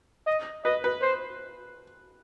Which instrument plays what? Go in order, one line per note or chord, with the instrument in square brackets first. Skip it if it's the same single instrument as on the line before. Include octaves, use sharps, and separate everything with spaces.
[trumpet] D#5
[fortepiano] B4 [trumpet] D#5
[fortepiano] B4
[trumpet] C5